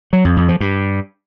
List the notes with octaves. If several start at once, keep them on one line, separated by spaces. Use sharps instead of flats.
F#3
F2
F2
F3
G2